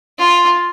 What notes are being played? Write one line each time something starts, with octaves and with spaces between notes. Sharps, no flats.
F4